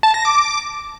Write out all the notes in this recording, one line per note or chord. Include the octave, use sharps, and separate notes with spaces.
A5
A#6
D6